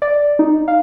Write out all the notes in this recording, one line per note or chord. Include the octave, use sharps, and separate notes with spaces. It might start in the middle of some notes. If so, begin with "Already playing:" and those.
D5
D#4
F5